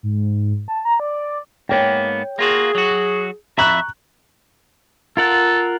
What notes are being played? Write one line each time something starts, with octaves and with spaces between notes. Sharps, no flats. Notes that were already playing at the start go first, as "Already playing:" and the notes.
G#2
A5
A#5
D5
G#2 A#3 B3 C#5 G5
A#3 F4 F#4 G#4
F#3 F#4
F2 E5 A#5 B5 C#6 F#6
F4 A4 A#4 F#5